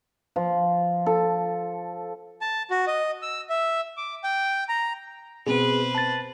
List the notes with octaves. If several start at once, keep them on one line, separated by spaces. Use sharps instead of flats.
F3
A4
A5
F#4
D#5
E6
E5
D6
G5
A#5
B2 B3 C4 G#4 B4 C5
A5 A6